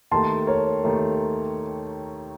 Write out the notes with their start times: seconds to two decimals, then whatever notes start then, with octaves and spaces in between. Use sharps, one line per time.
0.11 D#2 D#3 A3 A5 C6
0.47 A#4 C#5
0.84 D#2 D#3 A3